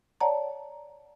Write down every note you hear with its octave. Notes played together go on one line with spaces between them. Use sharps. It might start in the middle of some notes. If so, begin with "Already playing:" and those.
C#5 D5 F#5 A5 A#5